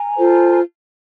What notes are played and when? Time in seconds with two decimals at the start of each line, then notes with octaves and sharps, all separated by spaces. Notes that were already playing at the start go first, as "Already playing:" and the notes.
Already playing: G#5 A#5
0.17 F4 A4 C5